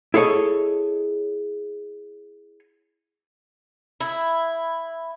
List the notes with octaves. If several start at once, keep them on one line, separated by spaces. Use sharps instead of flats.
E4 G#4 A4 C#5 D#5
E4